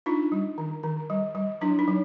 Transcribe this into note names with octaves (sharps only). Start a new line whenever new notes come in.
D4 D#4 F4
G3
D#3
D#3
G3
G3
F#3 D4 E4
D#4
F#3